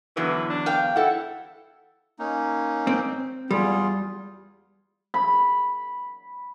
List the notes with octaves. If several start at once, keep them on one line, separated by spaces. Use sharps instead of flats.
E2 D3 E3 F#3
D4
F5 G5
E4 A4 F#5
A#3 C#4 D#4
C4
E2 G3 F4 G#4
B5